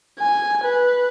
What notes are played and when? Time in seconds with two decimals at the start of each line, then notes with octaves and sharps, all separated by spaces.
0.19 G#5
0.64 B4